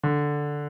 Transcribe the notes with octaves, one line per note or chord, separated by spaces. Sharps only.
D3